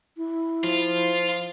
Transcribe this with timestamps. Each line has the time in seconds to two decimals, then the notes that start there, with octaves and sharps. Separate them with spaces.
0.17 E4
0.64 F3 F4